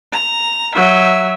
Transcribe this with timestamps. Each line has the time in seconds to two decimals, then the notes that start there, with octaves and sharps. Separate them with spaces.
0.12 A#5
0.75 F#3 E5